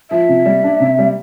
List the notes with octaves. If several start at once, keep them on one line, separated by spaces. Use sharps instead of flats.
F3 E5
C3
G3
D4
C3
G3